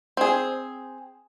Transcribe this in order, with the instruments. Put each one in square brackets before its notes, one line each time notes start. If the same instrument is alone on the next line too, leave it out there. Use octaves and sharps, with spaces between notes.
[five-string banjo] C4 G#4